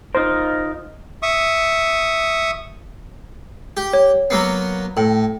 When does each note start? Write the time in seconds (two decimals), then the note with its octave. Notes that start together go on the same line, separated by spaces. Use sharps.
0.15 D#4 F4 A#4 C5
1.22 E5 C#6 D#6
3.77 G4
3.93 C#5
4.30 F#3 A#3 B3 E6 C7
4.97 A2 A4 G5